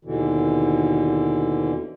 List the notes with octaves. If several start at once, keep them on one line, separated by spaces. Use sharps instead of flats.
D#2 B2 D3 E3